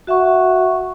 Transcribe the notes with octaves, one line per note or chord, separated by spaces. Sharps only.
F#4 E5 F#5 C#6